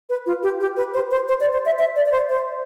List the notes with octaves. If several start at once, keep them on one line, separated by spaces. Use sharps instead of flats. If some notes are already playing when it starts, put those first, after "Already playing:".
B4
F4
G4
G4
B4
C5
C5
C5
D5
C5
E5
E5
D5
D5
C5
C5